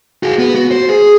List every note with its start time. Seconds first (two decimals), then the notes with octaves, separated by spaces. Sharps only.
0.23 F#4 G#4
0.38 B3
0.55 F#4
0.71 C5
0.89 G#4